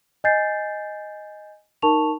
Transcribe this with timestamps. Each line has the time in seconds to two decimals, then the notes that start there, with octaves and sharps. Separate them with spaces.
0.24 D#5 G#5 G6 A6 C7
1.82 D#4 A#4 A5 C#6 F7